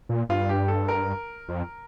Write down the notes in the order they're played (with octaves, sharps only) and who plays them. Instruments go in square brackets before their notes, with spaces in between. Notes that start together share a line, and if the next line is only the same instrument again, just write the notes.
[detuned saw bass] A#2
[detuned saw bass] G2 [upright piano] F4
[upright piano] G4
A4
A#4
[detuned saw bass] F2